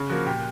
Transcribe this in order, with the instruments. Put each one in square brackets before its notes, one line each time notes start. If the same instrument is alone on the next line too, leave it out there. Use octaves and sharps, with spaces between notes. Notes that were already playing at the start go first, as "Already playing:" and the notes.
Already playing: [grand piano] C#3
F3 A#3 F#4
A#2 G4